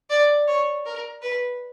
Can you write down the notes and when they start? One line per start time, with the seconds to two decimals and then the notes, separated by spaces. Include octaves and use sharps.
0.10 D5
0.48 C#5
0.86 A#4
1.22 B4